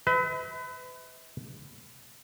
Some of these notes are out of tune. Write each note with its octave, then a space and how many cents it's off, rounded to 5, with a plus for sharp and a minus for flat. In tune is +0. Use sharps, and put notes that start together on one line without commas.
B4 +30 E5 -40